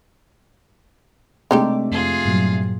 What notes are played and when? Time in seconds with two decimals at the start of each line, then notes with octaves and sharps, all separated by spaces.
1.51 C3 G#3 A3 D4 D#4 G4 D6
1.92 F2 F4 G#4
2.25 G2 A#2 F#3